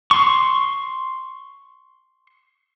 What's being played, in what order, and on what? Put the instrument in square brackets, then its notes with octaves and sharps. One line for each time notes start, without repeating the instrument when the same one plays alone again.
[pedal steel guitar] C6 C#6